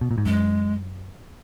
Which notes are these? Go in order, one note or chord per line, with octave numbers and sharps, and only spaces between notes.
B2
A#2
G#2
F#2 G#3